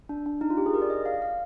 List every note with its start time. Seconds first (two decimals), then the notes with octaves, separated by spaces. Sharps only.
0.09 D4
0.26 D4
0.41 D#4
0.50 F4
0.57 G4
0.66 G#4
0.74 A#4
0.82 D5
0.90 D#5
1.06 F5
1.22 F5